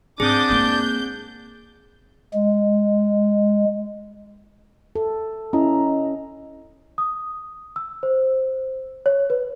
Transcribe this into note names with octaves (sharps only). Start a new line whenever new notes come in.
G#2 C4 D4 G#4 D6 D#6 G6
G#3 A#3 G6
G#3
A4
C#4 E4 D#5 A#5
D#6
E6
C5
C#5
B4